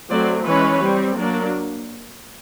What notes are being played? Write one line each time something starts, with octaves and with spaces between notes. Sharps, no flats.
F#3 A3 C4 C5 D5
E3 G#3 C#4 B4 C#5
G3 C4
F#3 A#3 D4